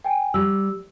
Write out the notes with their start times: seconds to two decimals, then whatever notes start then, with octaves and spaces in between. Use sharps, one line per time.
0.04 G5 G#5
0.34 G3 E6